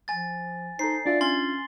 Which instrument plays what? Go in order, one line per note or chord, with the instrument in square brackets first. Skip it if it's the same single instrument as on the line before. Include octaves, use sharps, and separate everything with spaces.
[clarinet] F3 [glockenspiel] G#5 A6
[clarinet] D#4 [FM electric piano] A4 C5 [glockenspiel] C7
[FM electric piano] D4 F4 E5 [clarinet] D5
[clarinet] C#4 [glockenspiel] C6 A6 G7